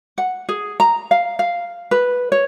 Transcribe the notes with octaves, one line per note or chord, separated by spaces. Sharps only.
F#5
G#4
A#5
F5
F5
B4
C#5